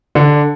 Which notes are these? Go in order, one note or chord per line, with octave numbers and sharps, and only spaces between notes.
D3